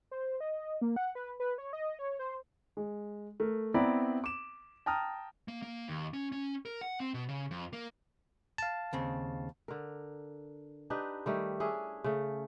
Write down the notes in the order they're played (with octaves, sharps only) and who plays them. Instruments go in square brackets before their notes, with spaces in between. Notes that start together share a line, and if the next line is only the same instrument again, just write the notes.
[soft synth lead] C5
D#5
A#3
F#5
B4
B4
C#5
D#5
C#5
C5
[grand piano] G#3
A3 A#4
B3 C4 E4 D5 A#5 B5
D6 E7
G5 A5 A#5 D#6 F6
[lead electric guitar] A#3
A#3
D#2
C#4
C#4
A#4
F#5
C4
B2
C#3
F2
A#3
[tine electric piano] F5 A5
[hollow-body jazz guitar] D#2 C#3 C4
[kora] D3 A#4
D4 D#4 G4 B4
D#3 G3 A3
C#4 D4 E4 G#4
C#3 A3